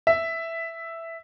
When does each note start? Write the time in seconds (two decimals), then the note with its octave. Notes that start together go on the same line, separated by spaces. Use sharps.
0.07 E5